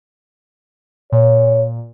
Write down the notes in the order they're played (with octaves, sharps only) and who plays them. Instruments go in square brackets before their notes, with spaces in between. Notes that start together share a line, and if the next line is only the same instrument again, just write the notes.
[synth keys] A#2 [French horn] C#5